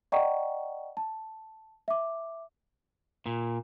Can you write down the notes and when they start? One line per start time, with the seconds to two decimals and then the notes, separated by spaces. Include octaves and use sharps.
0.12 D5 D#5 F#5 G5 A#5 C#6
0.97 A5
1.88 E5 D6
3.26 A#2